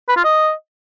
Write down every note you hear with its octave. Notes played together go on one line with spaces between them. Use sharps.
B4
F4
D#5